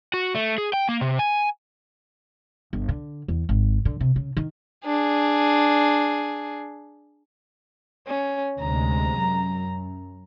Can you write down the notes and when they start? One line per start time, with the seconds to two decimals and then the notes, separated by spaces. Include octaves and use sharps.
0.14 F#4
0.35 A3
0.58 G#4
0.73 G5
0.89 A#3
1.01 C3
1.19 G#5
2.73 G1
2.89 D3
3.28 E2
3.49 G#1
3.85 D3
4.00 C3
4.16 C#3
4.37 D#3
4.86 D4 G#4
8.07 C#4
8.60 D2 C3 G#3 A#5
9.22 F#2